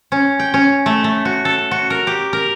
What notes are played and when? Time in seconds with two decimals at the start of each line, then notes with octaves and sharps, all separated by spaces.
0.12 C#4
0.40 G5
0.54 C#4
0.86 A3
1.04 A3
1.25 F#4
1.45 A4
1.71 F#4
1.90 A#4
2.07 G4
2.33 A#4